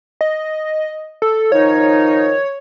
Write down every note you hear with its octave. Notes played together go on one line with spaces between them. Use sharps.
D#5
A4
D#3 F3 D#4 C#5